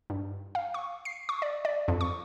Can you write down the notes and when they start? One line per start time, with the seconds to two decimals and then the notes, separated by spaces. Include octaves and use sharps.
0.10 G2
0.55 F5
0.74 C#6
1.05 C7
1.29 C#6
1.42 D5
1.65 D5
1.88 F2
2.01 C#6